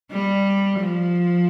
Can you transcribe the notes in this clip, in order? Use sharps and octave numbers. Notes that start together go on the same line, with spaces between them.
G3
F3